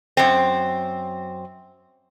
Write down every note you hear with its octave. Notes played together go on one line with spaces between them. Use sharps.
F#2 C4